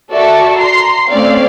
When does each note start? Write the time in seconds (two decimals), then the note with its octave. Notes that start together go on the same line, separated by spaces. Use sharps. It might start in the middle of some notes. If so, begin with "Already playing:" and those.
0.11 F#4 A4 D5 E5 A5 C#6
0.57 A#5 C6 C7
1.08 A3 C4 C#4 D5 F5